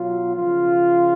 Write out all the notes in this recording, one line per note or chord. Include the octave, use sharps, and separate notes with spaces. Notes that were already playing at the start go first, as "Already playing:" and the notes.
Already playing: B2 F#3 F4
C#3 F3 F4